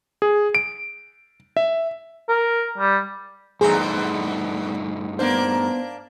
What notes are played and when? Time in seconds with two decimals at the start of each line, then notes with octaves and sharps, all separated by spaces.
0.22 G#4
0.55 D7
1.57 E5
2.29 A#4
2.78 G3
3.61 E2 G2 A3 B3 D#4 G#4 C5 A#5
5.19 A#3 B3 D4 C5